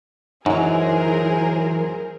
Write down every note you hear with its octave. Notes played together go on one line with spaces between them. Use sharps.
F#2 E3 F#3 D#4 G#4 A#4 C5